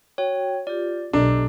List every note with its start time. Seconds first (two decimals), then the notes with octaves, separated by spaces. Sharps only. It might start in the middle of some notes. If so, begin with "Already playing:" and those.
0.18 F#4 C#5 G5
0.67 F4 G4 D5
1.13 B1 D4 G4 A4 D#5 A#5